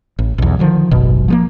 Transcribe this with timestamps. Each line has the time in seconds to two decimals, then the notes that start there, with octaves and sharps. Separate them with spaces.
0.19 A1
0.38 B1 E2
0.59 D3 D#3 F3
0.91 D#1 G#1 F#2 B2
1.28 F3 G#3 A#3